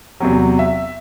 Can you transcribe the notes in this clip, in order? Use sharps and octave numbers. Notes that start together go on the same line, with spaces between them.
E2 C3 F#3
E5